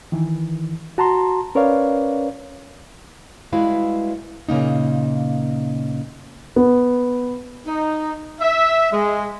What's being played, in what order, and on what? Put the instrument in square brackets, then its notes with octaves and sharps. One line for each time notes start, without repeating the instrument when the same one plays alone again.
[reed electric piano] D#3 E3
F#4 A5 A#5 C6
C#4 A#4 B4 C#5 D5 F5
[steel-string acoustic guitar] G3 G#3 E4 F#4 B4 F5
A#2 C#3 A#3 D#4
[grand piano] B3
[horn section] D#4
E5
G#3